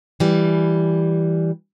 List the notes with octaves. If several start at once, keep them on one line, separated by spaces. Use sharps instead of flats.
E3 G3